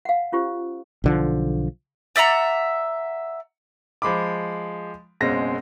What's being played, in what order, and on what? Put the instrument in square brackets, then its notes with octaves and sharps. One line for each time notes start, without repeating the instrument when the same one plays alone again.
[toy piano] F5 F#5
C#4 F4 G4 C5
[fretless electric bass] B1 D3 F3
[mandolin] D5 E5 F#5 A#5
[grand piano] F3 G#3 B5 D6
F#1 F#2 B2 G#3 C4 A#6